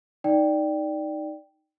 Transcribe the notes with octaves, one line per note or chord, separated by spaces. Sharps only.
D#4 D5 G5